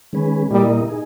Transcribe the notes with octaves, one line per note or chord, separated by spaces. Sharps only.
D#3 G#3 C#4 G#4 B4
A#2 G3 A#3 E4 A#4 D#5
D#4 G#4